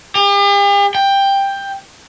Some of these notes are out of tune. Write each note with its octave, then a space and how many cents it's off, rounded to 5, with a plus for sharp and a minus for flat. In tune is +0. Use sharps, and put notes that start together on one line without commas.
G4 +45
G5 +10